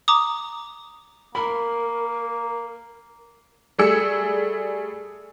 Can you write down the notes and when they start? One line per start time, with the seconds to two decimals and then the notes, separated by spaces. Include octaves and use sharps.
0.08 A#5 D6 D#6
1.35 A#3 A#4 B5
3.78 G3 A3 G#4 E6 C#7